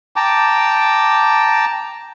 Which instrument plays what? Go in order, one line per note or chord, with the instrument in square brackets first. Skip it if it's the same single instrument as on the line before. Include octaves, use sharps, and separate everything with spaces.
[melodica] G5 A5 A#5 D6